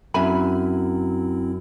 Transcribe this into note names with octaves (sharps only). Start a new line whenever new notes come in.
F#2 C4 E4 E5 G#5 B5